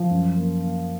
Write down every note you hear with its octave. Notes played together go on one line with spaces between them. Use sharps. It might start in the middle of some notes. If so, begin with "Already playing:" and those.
Already playing: F3
F#2
A#3
A#3